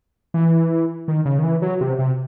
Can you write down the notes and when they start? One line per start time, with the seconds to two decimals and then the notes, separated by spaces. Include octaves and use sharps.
0.34 E3
1.08 D#3
1.25 C#3
1.39 D#3
1.44 E3
1.62 F#3
1.81 C3
1.99 C3